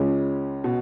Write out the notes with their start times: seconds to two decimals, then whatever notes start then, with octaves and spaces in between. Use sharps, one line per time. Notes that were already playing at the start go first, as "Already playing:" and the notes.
Already playing: C#2 C#3 G#3 C#4
0.64 B2